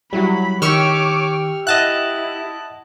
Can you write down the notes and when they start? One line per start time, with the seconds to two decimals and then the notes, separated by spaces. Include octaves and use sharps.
0.13 F#3 G3 E4 F#4 B5
0.62 D#3 G4 C#5 C#6 D6 E6 F6
1.67 E4 D#5 E5 F#5 A5 F#6